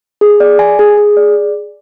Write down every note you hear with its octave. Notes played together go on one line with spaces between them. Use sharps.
G#4
D5
G#5
G#4
G#4
D5